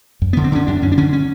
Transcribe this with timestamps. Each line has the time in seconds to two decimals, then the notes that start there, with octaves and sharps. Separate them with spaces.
0.22 F#2
0.33 D3 B3
0.44 C4
0.52 D3 C#4
0.67 F#2 D4
0.82 F#2 C#4
0.92 D4
0.97 D3 C#4
1.13 C#4